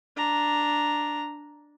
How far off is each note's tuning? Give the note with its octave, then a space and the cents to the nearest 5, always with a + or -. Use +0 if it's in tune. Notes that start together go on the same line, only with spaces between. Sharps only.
D4 +0 A#5 +0